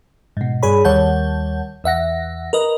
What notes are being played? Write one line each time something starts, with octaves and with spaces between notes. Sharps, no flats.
G#2 B2
G2 G#4 C#5 B5
D#2 G3 C#5 F#5 A5 G6
E2 E5 F#5 A#6
A#4 B4 D#5